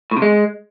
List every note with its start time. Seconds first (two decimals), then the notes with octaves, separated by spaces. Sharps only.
0.11 A2
0.17 C3
0.22 G#3